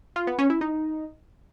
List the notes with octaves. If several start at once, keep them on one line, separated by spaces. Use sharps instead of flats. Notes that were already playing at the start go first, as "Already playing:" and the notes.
F4
B3
C#4
E4
D#4